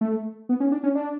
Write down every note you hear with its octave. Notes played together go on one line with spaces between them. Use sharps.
A3
B3
C#4
D4
C#4
D4